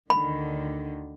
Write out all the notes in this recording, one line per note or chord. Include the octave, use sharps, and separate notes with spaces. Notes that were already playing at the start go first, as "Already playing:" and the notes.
D2 D3 D#3 B5